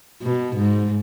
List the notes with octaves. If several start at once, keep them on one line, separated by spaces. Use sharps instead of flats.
B2
G#2